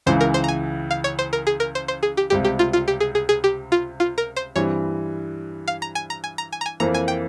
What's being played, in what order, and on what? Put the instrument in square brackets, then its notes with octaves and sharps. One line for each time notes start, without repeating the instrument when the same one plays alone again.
[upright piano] C#2 C#3 E3 [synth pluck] C5
[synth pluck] A#4
C5
A#5
G#5
F5
C#5
C5
A#4
G#4
A#4
C5
C5
G#4
G4
[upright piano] C#2 C3 G3 [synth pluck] G4
[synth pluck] G4
F4
F4
G4
G#4
G#4
G#4
G4
F4
F4
A#4
C5
[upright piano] G2 E3 G3 C4 [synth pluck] C#5
[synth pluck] F5
A#5
G#5
A#5
G#5
A#5
G#5
A#5
G#5
[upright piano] F2 E3 A#3 [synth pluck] A#5
[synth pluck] G#5
G5